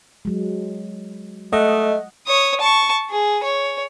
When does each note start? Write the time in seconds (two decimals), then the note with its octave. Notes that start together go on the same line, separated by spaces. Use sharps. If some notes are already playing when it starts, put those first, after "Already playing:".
0.25 F#3 G#3
1.53 A3 D#5 F#5
2.27 C#5 D#6
2.61 A5 C#6
3.10 G#4
3.44 C#5